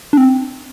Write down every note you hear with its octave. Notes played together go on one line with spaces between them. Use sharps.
D4
C4